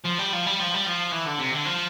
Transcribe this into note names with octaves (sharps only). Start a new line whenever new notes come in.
F3
G3
F3
G3
F3
G3
F3
E3
D3
C3
D3
F3